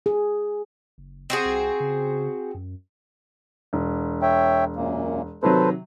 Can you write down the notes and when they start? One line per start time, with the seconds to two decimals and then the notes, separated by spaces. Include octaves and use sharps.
0.06 G#4
0.98 F#1
1.30 C4 F#4 G#4
1.45 C2
1.80 C#3
2.54 F#2
3.73 E1
4.22 C#5 E5 G5
4.76 F#2 A#2 A#3
5.43 C3 D#3 F#3 A4 B4 C5